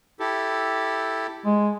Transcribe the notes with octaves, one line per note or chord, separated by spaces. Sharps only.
E4 G4 A4
G#3